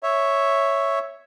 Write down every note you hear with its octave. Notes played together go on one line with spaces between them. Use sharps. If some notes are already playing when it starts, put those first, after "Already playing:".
C#5 E5